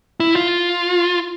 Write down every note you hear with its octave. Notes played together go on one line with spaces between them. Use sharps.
E4
F4